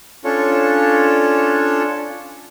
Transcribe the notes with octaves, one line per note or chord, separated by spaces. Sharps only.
C#4 D4 F4 A4 C#5